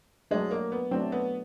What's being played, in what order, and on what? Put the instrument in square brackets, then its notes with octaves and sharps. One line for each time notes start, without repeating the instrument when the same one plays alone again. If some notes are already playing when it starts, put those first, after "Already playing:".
[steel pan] F#3 A3 D4 [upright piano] G#3
[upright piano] A#3
B3
[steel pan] F#3 A3 D4 [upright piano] C4
[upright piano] B3